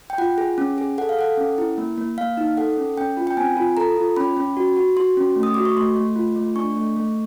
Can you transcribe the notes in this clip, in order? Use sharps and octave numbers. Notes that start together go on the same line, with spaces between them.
G5
F4 F#5
G#4
C#4
G#4
A4 F#5
F5
A4 F#5
C#4
E4
A#3
A#3
A#3 F5
D#4
A4 F#5
C#4
C#4 G5
F4
G5
C4 G#5
F4
A4 A#5
F4
C#4 B5
C#4
F#4
F#4
F#4 C6
C#4
A3
D#6
F#4 D6
C#6
A3 C6
A3
F4
A3
D4 C#6
A3
A3